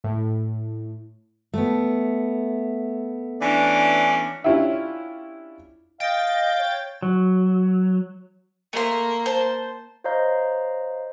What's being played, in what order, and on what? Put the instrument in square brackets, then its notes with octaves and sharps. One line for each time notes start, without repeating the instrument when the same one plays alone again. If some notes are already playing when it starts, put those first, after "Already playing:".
[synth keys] A2
[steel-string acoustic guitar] A3 B3
[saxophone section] E3 C#4 D4
[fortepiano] C#4 D4 E4 F4 G4 E5
[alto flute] D#5 [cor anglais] F5 [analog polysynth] G5 A6
[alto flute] C#5
[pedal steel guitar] F#3
[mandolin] A3 C6 [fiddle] A#3
[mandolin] C5 A5
[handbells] C5 C#5 D#5 F5 A#5 G6